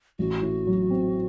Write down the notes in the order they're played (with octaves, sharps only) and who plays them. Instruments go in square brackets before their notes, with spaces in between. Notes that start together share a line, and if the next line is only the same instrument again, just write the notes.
[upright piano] A1 [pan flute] F#4
[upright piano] A2
F#3
C4